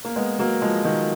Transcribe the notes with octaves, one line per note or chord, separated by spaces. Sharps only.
A#3
G#3 B3
F#3 A#3
F3 G#3
D#3 F#3